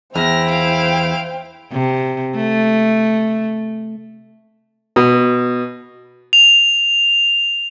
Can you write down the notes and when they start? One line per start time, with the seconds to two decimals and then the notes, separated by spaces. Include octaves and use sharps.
0.16 E2 E4 C5 G5 F6 A#6
0.50 F5 D7
1.72 C3
2.36 A3
4.96 B2
6.33 F7